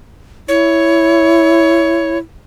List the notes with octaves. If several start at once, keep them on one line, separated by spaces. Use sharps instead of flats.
E4 C#5